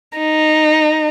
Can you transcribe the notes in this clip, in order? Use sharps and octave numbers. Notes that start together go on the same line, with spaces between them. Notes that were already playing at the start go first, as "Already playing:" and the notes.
D#4